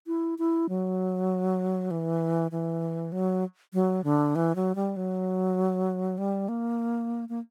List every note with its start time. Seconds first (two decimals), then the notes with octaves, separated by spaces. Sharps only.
0.07 E4
0.38 E4
0.69 F#3
1.91 E3
2.51 E3
3.12 F#3
3.73 F#3
4.04 D3
4.35 E3
4.56 F#3
4.75 G3
4.96 F#3
6.18 G3
6.49 A#3
7.29 A#3